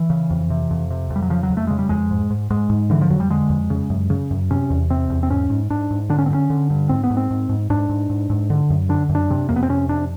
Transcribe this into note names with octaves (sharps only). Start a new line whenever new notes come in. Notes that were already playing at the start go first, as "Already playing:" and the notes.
Already playing: E3
C#3
F2
C3
F2
C3
F2
G3
F#3
C#3 F3
F#3
F2
A3
C#3 G#3
G3
F2 G#3
G#2
G#2
G#2 G#3
G#2
D3 E3
F3
F2 F#3
G3
D3 G#3
F2
C#3
F#2
C#3
F#2
C3 C#4
E2
C3 C4
E2
C4
G#2 C#4
G#2
G#2 D4
G#2
D3 D4
C#4
C4
G2
C#4
D3
G2
G#2 C4
B3
G#2
C4
G#2
G#2
G#2 D4
G#2
G#2
G#2
D3
F#2
D3 D4
F#2
D4
C3
F2 A#3
B3
C4
C3 C#4
F2 D4